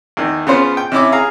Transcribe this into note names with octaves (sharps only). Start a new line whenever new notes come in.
E2 D#3
C#3 B3 F4 C5
G5
C3 C#4 E4 D6
G#4 F5 A#5